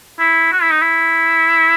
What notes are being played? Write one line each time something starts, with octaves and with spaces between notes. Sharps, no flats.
E4
F#4
E4
D#4
E4